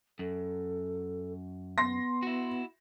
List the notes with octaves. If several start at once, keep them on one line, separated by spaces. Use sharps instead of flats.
F#2 A4
B3 C6 A#6
E4 F#4